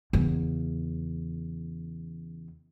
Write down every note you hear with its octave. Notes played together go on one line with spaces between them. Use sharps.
E2 C#3